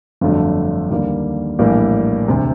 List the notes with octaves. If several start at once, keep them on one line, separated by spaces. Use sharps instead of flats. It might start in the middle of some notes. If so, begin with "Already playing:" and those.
G1 F2 D3 F#3 A3
D#2 D3 G3 A#3
A#1 A2 E3 G3 A#3
E1 D2 C3